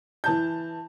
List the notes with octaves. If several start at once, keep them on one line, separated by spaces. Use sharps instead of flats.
E3 A5 G6